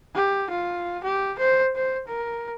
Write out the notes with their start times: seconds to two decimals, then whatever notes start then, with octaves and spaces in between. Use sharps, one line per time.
0.15 G4
0.50 F4
1.04 G4
1.39 C5
1.76 C5
2.08 A#4